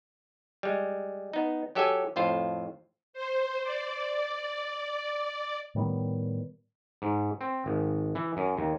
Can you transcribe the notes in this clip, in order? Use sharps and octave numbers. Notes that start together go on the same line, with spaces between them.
G3 G#3
B3 D#4
F#3 G4 A4 E5 G5 G#5
F2 A2 F4 C5
C5
D5
A2 D#3 G3 B3
G#2
C4
G#1
E3
F#2
D#2